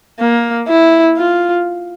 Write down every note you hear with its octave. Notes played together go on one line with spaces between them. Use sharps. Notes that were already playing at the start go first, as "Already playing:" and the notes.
A#3
E4
F4